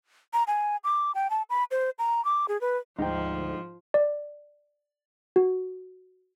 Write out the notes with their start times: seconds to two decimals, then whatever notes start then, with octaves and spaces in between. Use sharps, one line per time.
0.33 A#5
0.47 G#5
0.84 D6
1.15 G5
1.30 A5
1.50 B5
1.71 C5
1.99 A#5
2.25 D6
2.48 G#4
2.61 B4
2.99 D2 G#2 F3 D#4 G5
3.94 D5
5.36 F#4